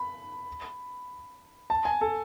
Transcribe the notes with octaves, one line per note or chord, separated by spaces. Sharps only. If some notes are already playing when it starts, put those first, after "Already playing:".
Already playing: B5
A5
G#5
A4